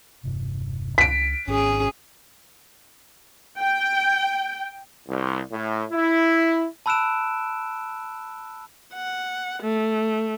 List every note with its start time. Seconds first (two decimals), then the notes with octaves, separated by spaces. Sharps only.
0.23 E1 G2 C3
0.98 C#2 D4 B6 D7
1.47 G#1 G#2 C#4 G#4
3.61 G5
5.07 C2
5.52 A2
5.91 E4
6.86 A5 B5 E6 F#6 D7 E7
8.94 F#5
9.62 A3